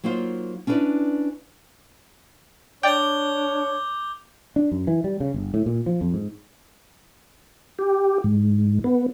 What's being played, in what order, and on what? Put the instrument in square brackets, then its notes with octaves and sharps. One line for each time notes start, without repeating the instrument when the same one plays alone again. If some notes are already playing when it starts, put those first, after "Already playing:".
[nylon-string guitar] F#3 A#3 D#4 F4 C5
C#4 D4 E4 A#4 B4 D5
[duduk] D4 [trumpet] C#5 [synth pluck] D5 G5 [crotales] D6 G6 G7
[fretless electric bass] D4
F#2
E3
G3
C#3
G1
A2
A#2
F3
F2
G#2
[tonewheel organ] G4
G#2
B3